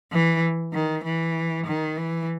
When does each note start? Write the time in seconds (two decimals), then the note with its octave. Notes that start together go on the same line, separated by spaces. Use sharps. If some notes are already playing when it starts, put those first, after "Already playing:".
0.12 E3
0.74 D#3
1.04 E3
1.67 D#3
1.97 E3